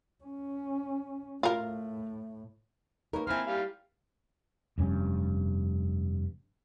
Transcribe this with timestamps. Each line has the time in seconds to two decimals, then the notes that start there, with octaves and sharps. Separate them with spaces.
0.24 C#4
1.43 A2 F4 A#4
3.13 A#3 D#4 A#4 B4 C#5
3.27 A#3 C4 E4 G#5 B5 C6 F6
3.47 G3 F5
4.78 F1 G2 C#4